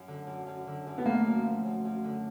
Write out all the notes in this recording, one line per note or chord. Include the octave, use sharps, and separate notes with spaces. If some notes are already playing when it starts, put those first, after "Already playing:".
Already playing: F#2
D3
F#2
F#2
D3
F#2
B3
A3 A#3
F#2
F3
F#2
F#2
D3